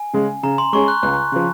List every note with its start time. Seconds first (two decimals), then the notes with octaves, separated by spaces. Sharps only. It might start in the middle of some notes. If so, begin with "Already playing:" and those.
Already playing: G#5
0.14 C#3 G#3
0.43 C#3 A#5
0.58 C6
0.73 G#3 C#4 G#4 C#6
0.88 F#6
1.03 C#2 F#6
1.32 C#3 F3